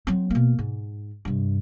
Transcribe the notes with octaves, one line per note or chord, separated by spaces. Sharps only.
F#3 C4
B2 A#3
G#2
G2 C3